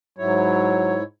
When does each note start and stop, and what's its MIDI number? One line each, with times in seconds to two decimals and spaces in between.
0.18 1.03 44
0.18 0.97 54
0.18 1.03 64
0.18 1.03 73